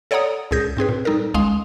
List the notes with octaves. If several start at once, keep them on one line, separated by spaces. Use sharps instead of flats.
A4 C#5 D5 F#5 A#5 D#6
C#2 A#2 G#4 G6 A#6
G#2 C4 G#4 B4
A#2
G3 D#4 A4 A#4
G1 C#2 G#3 F5 C6 D#6